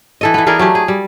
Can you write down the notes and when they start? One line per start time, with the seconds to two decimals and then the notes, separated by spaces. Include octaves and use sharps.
0.21 E3 A4 D#5
0.34 E3 B3
0.47 E3 G#4 A#4 D5
0.59 F#3 A3 G4
0.75 G#4
0.88 G3